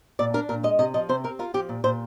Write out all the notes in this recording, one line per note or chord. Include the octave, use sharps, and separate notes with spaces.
A#2 D5
D4 A#4
A#2 A#4
G#3 D#5
C3 D#5
F3 D#5
C3 C5
C4 A#4
F4 A#4
F3 G4
A#2
A#2 C5